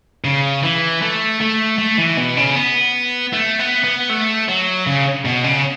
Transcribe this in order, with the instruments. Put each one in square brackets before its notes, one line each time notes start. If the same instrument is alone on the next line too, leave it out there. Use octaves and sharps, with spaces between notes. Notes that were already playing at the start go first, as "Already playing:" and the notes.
[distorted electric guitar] C#3
E3
A3
A3
A3
E3
B2
C#3
B3
A3
B3
B3
A3
F#3
C#3
B2
C#3